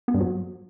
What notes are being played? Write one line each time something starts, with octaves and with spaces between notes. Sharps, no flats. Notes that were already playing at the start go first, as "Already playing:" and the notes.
B3
G2
F#3